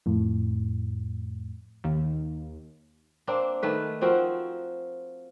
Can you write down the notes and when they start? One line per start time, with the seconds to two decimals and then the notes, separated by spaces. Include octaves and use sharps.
0.06 F2 A2
1.84 D#2
3.27 A#3 C4 D4
3.63 D#3 A3 B4
4.01 F3 C4 F#4 A#4